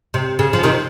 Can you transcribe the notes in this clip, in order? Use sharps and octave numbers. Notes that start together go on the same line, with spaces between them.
C3
C#3
F3
C3 D#3